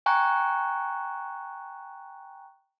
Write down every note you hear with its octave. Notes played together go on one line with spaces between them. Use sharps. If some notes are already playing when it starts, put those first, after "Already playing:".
G5 G#5 A#5 C#6 F#6